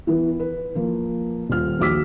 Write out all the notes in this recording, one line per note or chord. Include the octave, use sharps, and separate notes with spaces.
E3 B3
B4
F3 A#3
D#1 F4 F6
A#1 D#2 F#4 D6 E6 B6